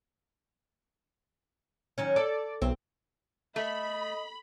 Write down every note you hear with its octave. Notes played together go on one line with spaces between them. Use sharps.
D#3 F#3 C#4
A4 D5
B1 C4
A3 D#5 B5